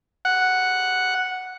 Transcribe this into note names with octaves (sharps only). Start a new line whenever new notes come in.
F#5